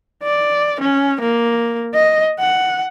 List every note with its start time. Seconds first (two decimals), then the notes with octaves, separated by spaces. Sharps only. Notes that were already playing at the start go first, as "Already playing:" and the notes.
0.23 D5
0.81 C#4
1.21 A#3
1.94 D#5
2.39 F#5